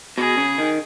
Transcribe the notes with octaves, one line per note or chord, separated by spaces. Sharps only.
B2 G#4
C#3
D#3